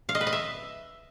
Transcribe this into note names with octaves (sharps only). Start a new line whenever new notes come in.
F5
D#5
B4
D#5
E5